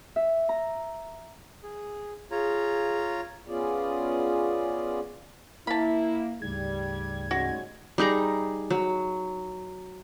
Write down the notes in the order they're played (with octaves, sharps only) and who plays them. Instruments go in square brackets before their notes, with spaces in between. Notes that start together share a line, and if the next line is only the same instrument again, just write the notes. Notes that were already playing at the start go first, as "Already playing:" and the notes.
[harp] E5
A#5
[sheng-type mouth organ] G#4
[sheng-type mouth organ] F4 C#5 A#5 [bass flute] G#4
[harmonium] B3 C#4 F4 G#4 D5
[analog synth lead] A#3 [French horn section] E4 [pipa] A5 B5
[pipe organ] D2 G#2 C#3 [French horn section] G3 [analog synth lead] G#6
[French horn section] G3 G#3 C#4 [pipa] F#4
[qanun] G3 D#4 G#4 A#5
F#3